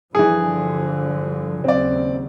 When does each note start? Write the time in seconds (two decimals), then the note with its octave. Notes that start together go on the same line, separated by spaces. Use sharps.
0.15 G2 D3 E3 F3 G#4
1.64 D#2 C#3 F#3 C4 D5